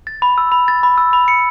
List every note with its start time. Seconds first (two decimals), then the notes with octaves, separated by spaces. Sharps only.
0.07 A6
0.22 B5
0.38 E6
0.52 B5
0.68 A6
0.83 B5
0.98 E6
1.13 B5
1.28 C#7